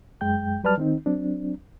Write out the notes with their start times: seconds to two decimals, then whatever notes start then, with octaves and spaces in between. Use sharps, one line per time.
0.21 F#2 G#3 G5 G6
0.64 F#3 G3 B4 D5 A5 F6
0.78 D#3 C4 D#4
1.06 F#3 C4 D4